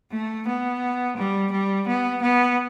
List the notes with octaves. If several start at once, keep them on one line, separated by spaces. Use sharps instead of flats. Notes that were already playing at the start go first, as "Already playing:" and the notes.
A3
B3
G3
G3
B3
B3